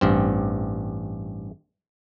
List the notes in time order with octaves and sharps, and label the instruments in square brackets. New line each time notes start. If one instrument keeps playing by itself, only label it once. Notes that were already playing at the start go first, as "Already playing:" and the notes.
[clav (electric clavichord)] A1 G2 C4